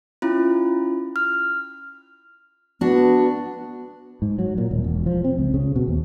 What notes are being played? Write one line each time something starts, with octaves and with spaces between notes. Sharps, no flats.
C#4 E4 F4
F6
B3 D4 F#4
G#2
F#3
A#2
D#1
E1
F3
C4
C#2
C#3
B2
D#2